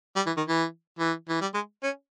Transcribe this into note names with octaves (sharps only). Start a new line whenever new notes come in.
G3
E3
D#3
E3
E3
E3
G3
G#3
C#4